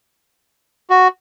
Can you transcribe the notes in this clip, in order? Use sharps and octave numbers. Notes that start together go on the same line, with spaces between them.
F#4